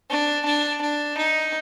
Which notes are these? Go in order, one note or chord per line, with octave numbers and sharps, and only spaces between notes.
D4
D4
D4
D#4